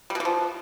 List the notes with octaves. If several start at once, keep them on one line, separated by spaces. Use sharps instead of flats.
G3
B2
E3
F3